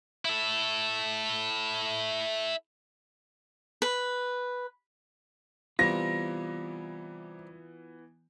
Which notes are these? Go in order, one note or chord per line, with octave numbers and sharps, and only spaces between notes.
E4 A4
B4
C3 E3 G3 B3 F4 A#6